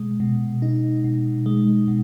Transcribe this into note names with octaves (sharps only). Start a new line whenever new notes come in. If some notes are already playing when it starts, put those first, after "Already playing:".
Already playing: B2 G#3
B2
D#4
B2
G#3
B2